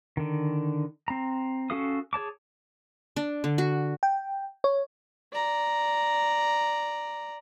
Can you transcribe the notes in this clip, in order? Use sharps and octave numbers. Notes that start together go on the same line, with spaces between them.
D3 D#3
C4 A#5
C#4 F#4 A4 F5 D#6
G#4 C#5 A5 D6
D4
D3
F#4
G5
C#5
D5 A#5